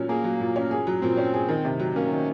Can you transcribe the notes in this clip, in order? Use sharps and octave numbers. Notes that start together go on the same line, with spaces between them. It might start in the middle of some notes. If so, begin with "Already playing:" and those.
Already playing: A#2 F#3 C#4
A#3 G#4
F#3
A#2
C#4
G#4
F#3
A#2 C4
C#4
G#4
D#3
C3
F#3
A#3 C#4
D#3